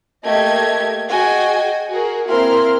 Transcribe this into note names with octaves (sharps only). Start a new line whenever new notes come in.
A3 A#3 G4 D#5 G#6
F#4 G#4 D#5 G5 G#5
F#4 G#4 A#4
A#3 C4 E4 A#4 C6 F6